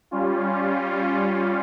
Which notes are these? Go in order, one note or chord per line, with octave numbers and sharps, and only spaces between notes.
G3 C#4 F4